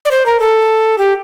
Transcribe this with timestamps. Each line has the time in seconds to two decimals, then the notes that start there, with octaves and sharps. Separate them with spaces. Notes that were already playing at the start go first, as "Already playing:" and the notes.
0.05 D5
0.11 C5
0.26 A#4
0.40 A4
0.98 G4